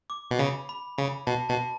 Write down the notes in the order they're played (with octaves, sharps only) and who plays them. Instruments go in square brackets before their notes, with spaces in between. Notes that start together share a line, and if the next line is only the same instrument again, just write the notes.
[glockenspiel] D6
[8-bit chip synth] B2
[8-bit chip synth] C#3 [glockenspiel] B5
[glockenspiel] B5
[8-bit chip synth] C#3 [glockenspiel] B5
[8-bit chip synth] B2 [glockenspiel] A5
[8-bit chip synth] B2 [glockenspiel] A5